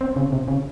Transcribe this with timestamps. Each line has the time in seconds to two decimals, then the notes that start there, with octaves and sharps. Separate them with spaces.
0.01 C4
0.16 C#3
0.32 C3
0.48 C#3